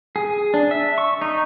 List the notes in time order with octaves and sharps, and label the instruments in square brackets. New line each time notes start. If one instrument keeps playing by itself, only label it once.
[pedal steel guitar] G#4
D4
E5
C#6
D#4